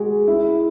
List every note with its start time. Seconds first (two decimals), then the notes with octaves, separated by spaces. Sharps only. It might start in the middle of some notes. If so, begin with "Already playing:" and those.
Already playing: G#3 F#4
0.28 E4